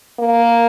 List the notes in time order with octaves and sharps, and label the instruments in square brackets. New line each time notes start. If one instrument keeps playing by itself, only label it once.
[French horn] A#3